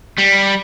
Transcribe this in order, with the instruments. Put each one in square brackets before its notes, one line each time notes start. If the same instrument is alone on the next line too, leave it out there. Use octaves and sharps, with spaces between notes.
[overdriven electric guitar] G3